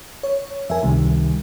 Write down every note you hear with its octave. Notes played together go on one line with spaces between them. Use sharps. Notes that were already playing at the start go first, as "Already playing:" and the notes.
C#5
F2 A#4 E5 G#5
C#2 C3 D#3 G3